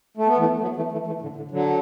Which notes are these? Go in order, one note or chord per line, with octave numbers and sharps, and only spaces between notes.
A3
B3
E3 A3
A3
F#3 B3
E3 A3
E3 A3
E3 A3
A2 D3
A2 D3
D3 F#3